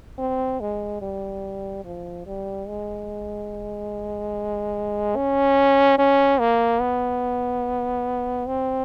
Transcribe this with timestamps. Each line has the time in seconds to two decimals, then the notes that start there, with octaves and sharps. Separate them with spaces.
0.18 C4
0.60 G#3
1.02 G3
1.84 F3
2.26 G3
2.68 G#3
5.16 C#4
5.98 C#4
6.40 A#3
6.81 B3
8.47 C4